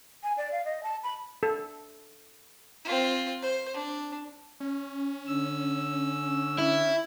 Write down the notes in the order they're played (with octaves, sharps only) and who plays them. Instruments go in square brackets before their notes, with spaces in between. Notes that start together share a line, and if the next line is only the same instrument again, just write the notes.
[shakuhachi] G#5
D5
F5
D#5
A5
B5
[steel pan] A4
[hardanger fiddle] C4 F4
C5
D4
[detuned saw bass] C#4
[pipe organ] D3 E6
[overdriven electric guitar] E4